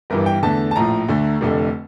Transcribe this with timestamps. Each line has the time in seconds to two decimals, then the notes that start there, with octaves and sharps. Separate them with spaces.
0.10 G1 G2 E3 A#4
0.26 G5
0.43 E2 D3 A3 A5
0.71 A5
0.76 A#1 A2 F3 A#5
1.08 D2 D3 A3
1.41 F1 F2 D3 A3